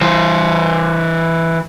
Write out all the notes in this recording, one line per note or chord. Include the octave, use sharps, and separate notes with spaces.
E3 C5